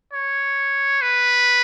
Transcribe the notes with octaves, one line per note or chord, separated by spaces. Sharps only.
C#5
B4